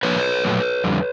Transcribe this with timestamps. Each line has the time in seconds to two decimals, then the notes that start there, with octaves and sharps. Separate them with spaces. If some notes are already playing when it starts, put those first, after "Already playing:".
0.03 A2 F3 A#3 D4 B4 C#5
0.44 A#2 F#3 A3
0.84 F2 D3 G3